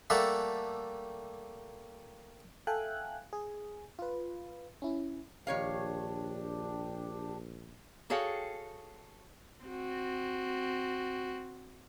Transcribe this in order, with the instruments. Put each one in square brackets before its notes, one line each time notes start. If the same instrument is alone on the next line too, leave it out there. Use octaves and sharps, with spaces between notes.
[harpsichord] G3 A3 A#3 A4 E5 F#5
[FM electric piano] A4 E5 F5 G5 G#5 F#6
G#4
F4 B4
C#4 E4
[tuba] A#1 [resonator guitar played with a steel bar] D#3 C#5 F5 [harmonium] D4 G4
[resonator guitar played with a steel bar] F#4 G#4 A4 C#5 F5 G5
[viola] C4 F#4